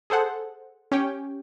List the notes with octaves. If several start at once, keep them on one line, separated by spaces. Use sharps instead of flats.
G#4 A4 C5 F#5 A5
C#4 G4 G5